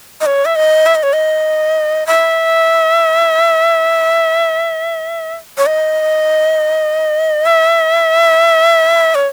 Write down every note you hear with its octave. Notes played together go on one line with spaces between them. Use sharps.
D#5
C#5
E5
D#5
E5
D#5
C#5
D#5
E5
C#5
D#5
E5
C#5